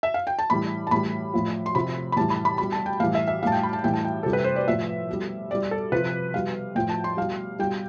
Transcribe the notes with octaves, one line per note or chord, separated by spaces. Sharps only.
E5
F5
G5
A5
A2 E3 G3 B5
A5
A2 E3 G3 B5
A2 F3
C6
C3 F3 B5
B5
A2 E3 G3 A5
B5
B5
B2 G3 B5
A5
G5
A2 E3 G3 F5
E5
E5
A2 G3 F5 A5
G5
B5
A5
A2 E3 G3 G5
A5
G5
C3 G3 A4
B4
C5
D5
A2 F3 E5
B2 G3
B2 G3 D5
A4
C3 F3 B4
B2 G3 F5
A2 F3 G5
A5
C6
B2 G3 F5
B2 G3 G5